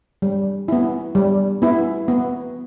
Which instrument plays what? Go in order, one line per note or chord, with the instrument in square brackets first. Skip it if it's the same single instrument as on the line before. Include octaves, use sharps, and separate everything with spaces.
[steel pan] G3
B3 E4
G3
B3 E4
B3